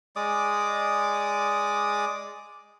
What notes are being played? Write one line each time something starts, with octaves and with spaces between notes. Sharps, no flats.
G#3 D5 D6 D#6